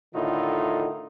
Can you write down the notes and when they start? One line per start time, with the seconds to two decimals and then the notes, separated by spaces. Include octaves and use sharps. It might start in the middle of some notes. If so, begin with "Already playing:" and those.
0.14 A2 D3 D#3 D#4 F4